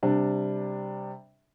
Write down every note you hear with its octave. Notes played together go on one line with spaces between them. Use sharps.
C3 G3 D4